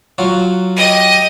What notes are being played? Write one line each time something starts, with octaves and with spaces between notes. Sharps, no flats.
F#3 F4 F#4
G4 D#5